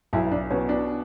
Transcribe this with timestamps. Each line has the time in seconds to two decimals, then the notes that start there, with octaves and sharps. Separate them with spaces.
0.13 B1 E4
0.31 D4
0.50 B2 C#4
0.69 D4